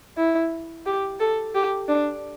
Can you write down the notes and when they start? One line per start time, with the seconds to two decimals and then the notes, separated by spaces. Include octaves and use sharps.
0.17 E4
0.86 G4
1.20 A4
1.55 G4
1.89 D4